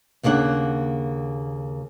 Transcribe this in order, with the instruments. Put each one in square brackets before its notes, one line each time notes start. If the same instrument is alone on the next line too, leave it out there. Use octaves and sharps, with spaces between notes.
[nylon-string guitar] D#2 C#3 A#3 D4 F#5